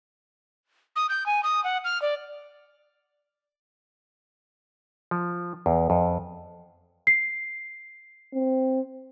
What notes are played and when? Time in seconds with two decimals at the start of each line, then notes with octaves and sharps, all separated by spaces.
0.96 D#6
1.09 G6
1.26 G#5
1.43 D#6
1.64 F#5
1.84 F6
2.02 D5
5.11 F3
5.66 E2
5.90 F2
7.07 C7
8.34 C4